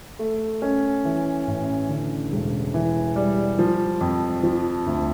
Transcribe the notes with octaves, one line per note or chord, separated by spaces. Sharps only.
A3
C#4
E3
A1
D3
E1
E3
G3
F3
F2
F3
D2